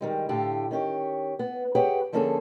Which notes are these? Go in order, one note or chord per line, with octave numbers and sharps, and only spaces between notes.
D#3 G3 G#3
A2 D3 F4 G4
D#3 C#4 G4 C#5
B3
G4 G#4 B4 C#5 F#5 G5
D3 F3 A#3 C#4 G#4 A4